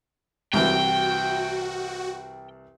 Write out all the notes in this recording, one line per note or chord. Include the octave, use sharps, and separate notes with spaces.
C2 E3 F#4 G5